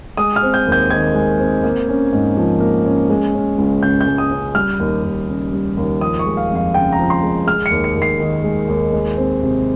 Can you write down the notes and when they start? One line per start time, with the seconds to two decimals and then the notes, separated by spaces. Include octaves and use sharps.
0.17 G#3 D#6
0.36 F6
0.42 C4
0.54 G6
0.67 D#2
0.72 G6
0.90 D#3 G#6
1.14 G#3
1.39 C4
1.64 A#3
1.88 C#4
2.12 G#2
2.37 F3
2.60 A#3
2.85 C#4
3.09 G#3
3.34 C#4
3.58 C#2
3.83 C#3 G6
4.01 G6
4.06 G#3
4.18 D#6
4.31 C#4
4.55 G3 F6
4.80 D#2
5.03 D#2
5.28 C#3
5.53 G3
5.77 D#2
6.01 F3 D#6
6.19 C#6
6.26 G#3
6.37 F5
6.50 F2
6.56 F5
6.74 C#3 G5
6.92 A#5
6.99 F3
7.10 C6
7.23 G#3
7.47 G#3 F6
7.66 C#7
7.71 D#2
7.84 C#7
7.96 D#2
8.02 C7
8.20 D#3
8.44 G#3
8.68 D#2
8.92 G#3
9.17 C4
9.42 C3